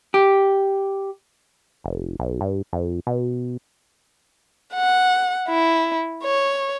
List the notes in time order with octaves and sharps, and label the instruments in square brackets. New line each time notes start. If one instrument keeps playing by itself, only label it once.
[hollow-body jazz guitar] G4
[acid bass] F1
B1
G2
F2
B2
[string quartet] F#5
E4
C#5